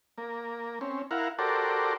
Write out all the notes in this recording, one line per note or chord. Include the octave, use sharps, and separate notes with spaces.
A#3
C4 C#4
E4 A#4 F5 F#5
F#4 G4 A4 A#4 C5 D5